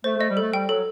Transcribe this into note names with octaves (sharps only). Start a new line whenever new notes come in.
A3 C5
A3
D#5
G3
A3 A4
G3 G5
F#3 A4